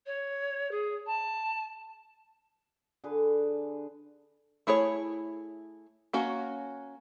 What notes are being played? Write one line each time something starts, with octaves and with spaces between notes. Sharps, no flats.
C#5
G#4
A5
D3 G#4 B4
A3 E4 G#4 C#5
A#3 C#4 F#4